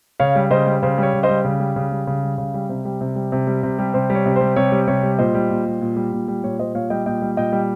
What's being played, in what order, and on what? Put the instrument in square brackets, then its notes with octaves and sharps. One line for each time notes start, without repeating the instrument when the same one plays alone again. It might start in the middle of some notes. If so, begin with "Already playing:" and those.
[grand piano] C#3 C#5 F5
G3
C#3 C5 D#5
G3
C#3 C5
G3 C#5
C#3
C5 D#5
G3
C#3
G3
C#3
G3
C#3
G3
C#3
G3
C3
G3
C3
G3
C3
G3
C3
G3
C3 C5
G3
C#5
C3
C5
G3
C3 C#5
G3
C3 C#5
G3
A#2 C5 D#5
G3
A#2
G3
A#2
G3
A#2
G3
A#2 C#5
G3 C5 D#5
A#2 C#5 F5
G3 D#5 G5
A#2 D#5 G5
G3
A#2 D#5 G5
G3